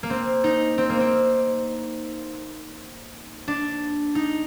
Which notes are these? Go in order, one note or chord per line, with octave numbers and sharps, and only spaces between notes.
A#3
C4
D#4
C4
A#3
C4
D4
D#4